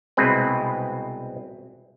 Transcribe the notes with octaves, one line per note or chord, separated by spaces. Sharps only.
C2 B2 G#3 C4 B4